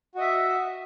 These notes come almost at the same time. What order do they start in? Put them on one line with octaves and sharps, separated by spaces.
F#4 D#5 E5